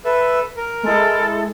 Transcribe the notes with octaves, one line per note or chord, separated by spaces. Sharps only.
A4 B4 E5
A#4
G#3 E4 A4